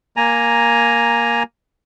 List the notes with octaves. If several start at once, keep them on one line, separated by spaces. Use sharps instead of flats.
A#3 G#5 A#5